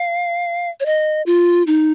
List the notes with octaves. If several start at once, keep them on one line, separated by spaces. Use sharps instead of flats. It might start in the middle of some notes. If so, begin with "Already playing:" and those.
Already playing: F5
C#5
D#5
F4
D#4